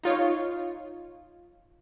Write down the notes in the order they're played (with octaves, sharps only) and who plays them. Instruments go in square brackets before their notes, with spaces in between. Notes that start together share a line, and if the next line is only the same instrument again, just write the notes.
[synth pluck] D#4 F4 C#5